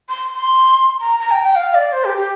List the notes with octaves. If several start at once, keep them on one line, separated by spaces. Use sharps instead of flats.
C6
C6
A#5
A#5
G5
G5
F5
D5
C5
G4
G4